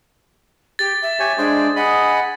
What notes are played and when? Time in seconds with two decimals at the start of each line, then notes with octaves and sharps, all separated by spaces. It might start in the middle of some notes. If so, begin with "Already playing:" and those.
0.79 G4 A6
1.02 E5
1.20 G4 C#5 G#5
1.38 G#3 D4 G#4 C5
1.76 G#4 D#5 F#5 B5